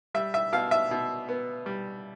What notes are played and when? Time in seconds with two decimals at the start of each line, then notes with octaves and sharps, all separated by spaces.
0.14 G3 E5
0.34 E5
0.52 B2 F5
0.71 E5
0.91 B2
1.29 B3
1.66 G3